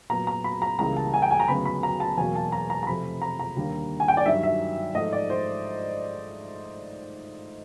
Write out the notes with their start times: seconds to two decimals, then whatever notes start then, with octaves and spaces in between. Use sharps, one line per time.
0.10 A#2 F#3 B3 A#5
0.27 A#5
0.44 B5
0.62 A#5
0.79 C#2 C#3 E3 G3 A#3 A#5
0.96 A5
1.14 G#5
1.22 G5
1.31 G#5
1.40 A#5
1.48 D2 C#3 F#3 B3 B5
1.65 B5
1.83 A#5
2.00 A5
2.17 E2 B2 F#3 A#3 G#5
2.35 A5
2.52 A#5
2.70 A#5
2.83 A#5
2.87 F2 C3 F3 A3 B5
3.22 A#5
3.39 A#5
3.57 D#2 D3 G3 A#3
4.00 G#5
4.08 G5
4.17 D5
4.26 G2 D#3 F#3 E5
4.43 E5
4.95 G#2 F3 A3 D#5
5.12 D5
5.30 C5